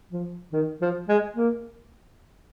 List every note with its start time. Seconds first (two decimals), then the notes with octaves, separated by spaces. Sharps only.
0.12 F3
0.53 D#3
0.81 F3
1.09 G#3
1.36 A#3